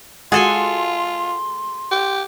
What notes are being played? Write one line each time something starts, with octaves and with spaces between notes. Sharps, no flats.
G#3 F4 F#4 G#4 A4 F#5 G#5 C6
G4